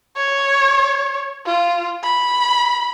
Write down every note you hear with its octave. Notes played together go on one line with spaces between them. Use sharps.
C#5
F4
B5